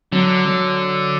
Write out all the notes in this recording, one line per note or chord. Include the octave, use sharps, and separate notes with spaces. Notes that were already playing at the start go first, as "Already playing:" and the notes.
D3 F#3
F#3